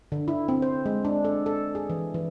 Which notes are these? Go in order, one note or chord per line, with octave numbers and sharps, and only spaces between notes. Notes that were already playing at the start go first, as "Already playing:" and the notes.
D3
E4
C4
C5
G#3
D4
A4
A4
G#4
E3
E3